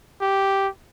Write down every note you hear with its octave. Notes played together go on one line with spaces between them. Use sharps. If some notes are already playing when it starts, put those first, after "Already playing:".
G4